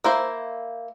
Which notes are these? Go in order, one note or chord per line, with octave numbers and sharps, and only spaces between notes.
A#3 E4 C5